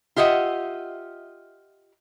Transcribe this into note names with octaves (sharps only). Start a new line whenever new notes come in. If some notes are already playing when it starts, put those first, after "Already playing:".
F4 G4 D#5 E5 F#5